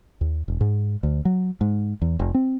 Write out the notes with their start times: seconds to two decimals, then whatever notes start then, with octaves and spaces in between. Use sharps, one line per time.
0.21 D#2
0.48 E1
0.61 G#2
1.03 D2
1.25 F#3
1.61 G#2
2.02 E2
2.19 F1
2.34 C4